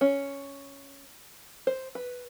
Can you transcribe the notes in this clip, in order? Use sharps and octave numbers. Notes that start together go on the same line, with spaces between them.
C#4
C5
B4